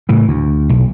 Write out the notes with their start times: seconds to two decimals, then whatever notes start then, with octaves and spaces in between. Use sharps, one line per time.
0.09 A2 C#3 E3
0.28 D2
0.69 B1